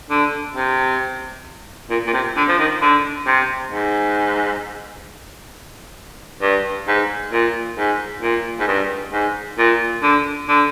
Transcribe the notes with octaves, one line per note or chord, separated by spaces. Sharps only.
D3
C3
A#2
A#2
C3
D3
F3
D#3
D3
C3
G#2
G2
G#2
A#2
G#2
A#2
G#2
G2
G#2
A#2
D3
D3